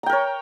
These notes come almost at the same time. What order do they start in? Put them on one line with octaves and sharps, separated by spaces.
A#5 G5 A#4 C#5